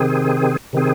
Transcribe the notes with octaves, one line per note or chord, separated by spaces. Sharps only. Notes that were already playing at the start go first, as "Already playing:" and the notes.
Already playing: C3 D#3 C4 G#4
C3 D#3 C4 G#4